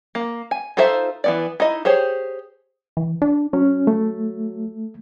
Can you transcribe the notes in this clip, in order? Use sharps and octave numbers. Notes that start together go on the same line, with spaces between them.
A#3
G#5
D#4 F4 A4 C5 E5
E3 B3 D5
D#4 E4 D#5
G4 G#4 C5 C#5
E3
D4
F#3 C#4
A3